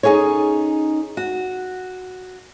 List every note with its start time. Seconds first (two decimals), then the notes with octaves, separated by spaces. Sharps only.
0.03 C#4 D#4 E4 G#4 A4 C#5
1.17 F#4